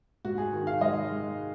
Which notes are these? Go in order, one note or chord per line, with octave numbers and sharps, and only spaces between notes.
G#2 F#4
G#4
D#3
F5
G#3 D#5
G#3